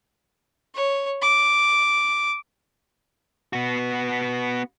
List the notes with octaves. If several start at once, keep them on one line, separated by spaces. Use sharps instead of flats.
C#5
D6
B3 F#4